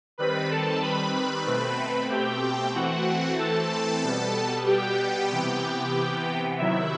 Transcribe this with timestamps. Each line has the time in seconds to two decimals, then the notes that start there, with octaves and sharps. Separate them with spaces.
0.18 D#3 G3 C4 B4 B5
0.50 A4 A5
0.82 B4 B5
1.14 B4 B5
1.46 B2 A3 C4
2.10 G4 G5
2.74 E3 A3 C4 F#4 F#5
3.39 A4 A5
4.03 B2 G3 B3
4.66 G4 G5
5.31 C3 E3 B3
6.58 C3 D#3 F#3 E4 E5